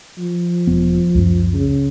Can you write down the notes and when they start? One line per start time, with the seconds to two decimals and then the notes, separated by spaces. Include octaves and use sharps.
0.18 F3
0.67 E1 B3
1.15 C#2 F#2
1.54 C#3